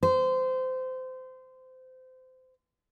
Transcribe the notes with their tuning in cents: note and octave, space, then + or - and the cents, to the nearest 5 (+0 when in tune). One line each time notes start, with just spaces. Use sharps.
C5 -25